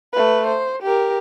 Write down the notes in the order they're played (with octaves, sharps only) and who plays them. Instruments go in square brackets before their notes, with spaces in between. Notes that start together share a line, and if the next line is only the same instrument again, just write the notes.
[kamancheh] A3 B4
C5
G4 A#4